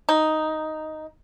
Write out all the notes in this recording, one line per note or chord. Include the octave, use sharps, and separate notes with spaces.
D#4